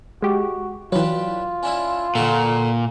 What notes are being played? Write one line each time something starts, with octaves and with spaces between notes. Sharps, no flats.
G#3 F#4 G4
E3 F#3 D4 F4 G4 B4
C#4 D4 E4
A#2 D3 F#4 A4